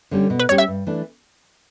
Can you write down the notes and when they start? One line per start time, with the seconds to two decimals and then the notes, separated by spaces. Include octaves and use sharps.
0.11 D3 G3 C#4 G4
0.30 B2
0.40 B4
0.48 G3 C#4 G4 C#5
0.58 E5
0.67 G2
0.87 E3 A3 D4